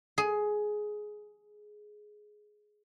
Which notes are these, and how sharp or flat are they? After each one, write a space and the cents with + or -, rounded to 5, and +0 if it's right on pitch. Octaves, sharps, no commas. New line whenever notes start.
G#4 +15